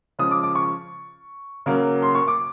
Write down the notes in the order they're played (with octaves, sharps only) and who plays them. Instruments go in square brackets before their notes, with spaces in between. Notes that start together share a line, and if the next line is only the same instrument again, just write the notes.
[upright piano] C#3 F3 G#3 D#6
D6
D6
C#6
C#3 F#3 A#3
C6
C#6
D6